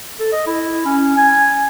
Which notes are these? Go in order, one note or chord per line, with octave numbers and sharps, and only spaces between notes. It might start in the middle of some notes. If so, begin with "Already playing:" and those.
A4
D#5
E4
C#4
G#5